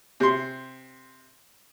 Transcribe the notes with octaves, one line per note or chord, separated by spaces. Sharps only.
C3 C6